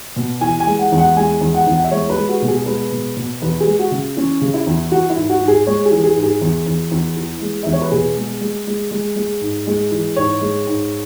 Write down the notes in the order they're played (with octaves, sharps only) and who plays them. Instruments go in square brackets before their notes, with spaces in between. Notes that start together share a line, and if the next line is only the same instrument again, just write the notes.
[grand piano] B2
E3 G#5
G#5
G#3
F#5
E2
F#5
G#3 G#5
E2
F#5
E2
F#5
E5
G#3 C#5
B4
G#3
F#4
B2 F#4
G#4
G#3 B4
B2
B2
E2 B4
G#4
G#3
F#4
C#3
E3 C#4
C#3
E4
E2
E3 F#4
E4
G#2
F#4
G#2
G#4
G#3 C#5
G#4
E3
G#4
G#2
G#4
E2
E2
E2
E3
G#3
E2 E5
C#5
B4
B2 G#4
G#3
G#3
G#3
G#3
G#3
G#2
G#3
E3
G#2 C#5
G#3
G#2